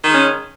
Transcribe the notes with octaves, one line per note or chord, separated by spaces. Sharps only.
D#3 G#3 C#4